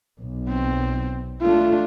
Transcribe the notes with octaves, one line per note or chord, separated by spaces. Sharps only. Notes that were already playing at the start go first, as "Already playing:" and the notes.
B1
C4
A3 D4 F4